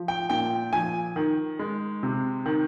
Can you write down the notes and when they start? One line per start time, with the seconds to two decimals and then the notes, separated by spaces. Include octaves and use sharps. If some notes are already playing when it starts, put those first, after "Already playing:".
Already playing: F3
0.08 G5
0.30 A#2 G5
0.73 F3 G#5
1.16 D#3
1.59 G#3
2.03 C3
2.46 D#3